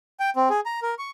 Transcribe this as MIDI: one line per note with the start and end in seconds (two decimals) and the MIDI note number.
0.20 0.30 79
0.36 0.49 60
0.50 0.60 68
0.66 0.80 82
0.82 0.95 70
0.99 1.11 85